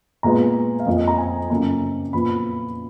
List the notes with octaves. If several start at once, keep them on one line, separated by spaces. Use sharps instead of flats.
A#2 G#3 B3 A#5
F5
F2 F3 A#3 D#5
D#5
A#5
G#5
F#2 C#3 F3 A#3 A#5
A#2 F3 B3 B5